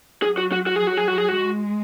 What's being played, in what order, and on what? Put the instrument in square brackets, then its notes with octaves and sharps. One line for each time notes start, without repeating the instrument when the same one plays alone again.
[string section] F#3 [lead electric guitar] G#4
[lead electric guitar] F#4
F#4
F#4
[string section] F#3 [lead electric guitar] G#4
[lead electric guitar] F#4
G#4
F#4
G#4
F#4
[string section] G#3